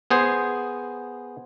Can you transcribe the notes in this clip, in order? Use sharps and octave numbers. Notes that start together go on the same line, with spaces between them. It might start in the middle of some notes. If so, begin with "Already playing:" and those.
B3 G#4 C5